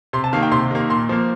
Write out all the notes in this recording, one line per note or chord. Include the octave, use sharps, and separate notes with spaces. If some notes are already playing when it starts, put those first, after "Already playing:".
C3 C6
A5
D#3 A#3 F5
G5
C3 C6
D#3 A#3
A#2 C6
F3 A#3